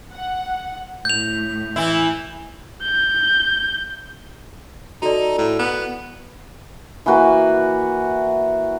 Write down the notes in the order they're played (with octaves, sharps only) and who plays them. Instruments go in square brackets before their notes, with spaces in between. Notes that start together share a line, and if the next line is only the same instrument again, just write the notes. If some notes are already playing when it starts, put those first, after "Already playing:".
[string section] F#5
[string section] A2 [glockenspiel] G6 F7
[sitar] E3 E4
[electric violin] G6
[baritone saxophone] D#4 [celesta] F#4 D5 [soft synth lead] A4
[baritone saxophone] A2
B3
[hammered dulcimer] E3 A#3 F#4 B4